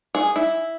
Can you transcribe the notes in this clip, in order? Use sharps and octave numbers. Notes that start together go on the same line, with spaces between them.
G#4
E4